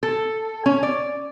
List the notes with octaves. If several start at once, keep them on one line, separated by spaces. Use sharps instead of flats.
A4
C#4
D5